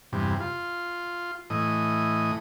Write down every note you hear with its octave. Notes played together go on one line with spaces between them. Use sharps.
E2 G2 C3
F4
A2 E3 D#5